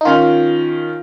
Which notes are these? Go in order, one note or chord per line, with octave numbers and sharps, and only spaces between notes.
D#4
D#3 C#4 F4